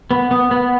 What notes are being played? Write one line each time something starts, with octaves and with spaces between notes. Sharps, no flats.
B3
B3
B3